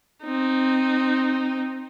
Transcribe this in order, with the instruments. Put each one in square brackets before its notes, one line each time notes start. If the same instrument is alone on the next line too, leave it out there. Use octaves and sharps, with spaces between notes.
[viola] C4 D#4